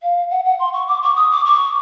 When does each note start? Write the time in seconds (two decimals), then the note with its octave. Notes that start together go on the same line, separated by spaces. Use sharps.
0.02 F5
0.30 F#5
0.45 F#5
0.59 C6
0.73 C#6
0.88 D6
1.02 C#6
1.16 D#6
1.31 D6
1.45 C#6